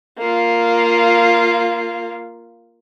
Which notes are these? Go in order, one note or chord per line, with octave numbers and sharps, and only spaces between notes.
A#3 F4